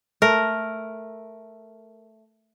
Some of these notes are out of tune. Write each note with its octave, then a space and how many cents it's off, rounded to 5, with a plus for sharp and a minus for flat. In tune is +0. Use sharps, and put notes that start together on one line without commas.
A3 +0 A#4 +0